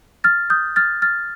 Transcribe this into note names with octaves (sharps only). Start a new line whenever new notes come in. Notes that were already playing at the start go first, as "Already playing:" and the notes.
F6 A6
D#6 G6
F6 A6
F6 A6